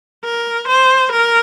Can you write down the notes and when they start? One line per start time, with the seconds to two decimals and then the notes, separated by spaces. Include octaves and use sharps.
0.24 A#4
0.68 C5
1.12 A#4